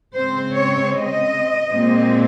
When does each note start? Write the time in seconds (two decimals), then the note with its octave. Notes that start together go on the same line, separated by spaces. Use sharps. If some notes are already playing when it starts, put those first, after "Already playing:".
0.14 C#3 G#3 C4 C5
0.54 C#5
0.94 D#5
1.71 A#2 G#3 C4